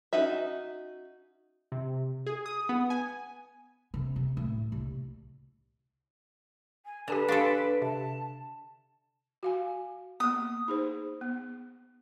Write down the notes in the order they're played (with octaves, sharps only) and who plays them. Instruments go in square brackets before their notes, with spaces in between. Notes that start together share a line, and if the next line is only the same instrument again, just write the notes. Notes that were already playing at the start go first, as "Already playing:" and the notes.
[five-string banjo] C#4 D#4 F#4 E5
[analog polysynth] C3
G#4
D#6
B3
G#5
[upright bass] C3
C3
A2
C2
[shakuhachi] G#5
[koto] D3 [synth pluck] G4 G#5 E7 [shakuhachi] B4
[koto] D4 A4 [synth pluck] F5 C6 D7
[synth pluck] C3 [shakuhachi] A5
[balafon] F#4 F5 G#5
[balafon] A#3 B3 [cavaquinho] D#6
[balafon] D#4 G#4 C5
B3